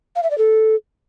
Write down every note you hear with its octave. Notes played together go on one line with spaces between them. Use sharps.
F5
E5
D5
A4